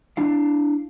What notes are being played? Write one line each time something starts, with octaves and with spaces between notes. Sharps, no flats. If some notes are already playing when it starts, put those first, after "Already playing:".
D4 E4 F5